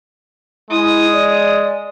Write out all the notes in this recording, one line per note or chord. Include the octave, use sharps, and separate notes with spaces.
G#3 E4 D#6
D5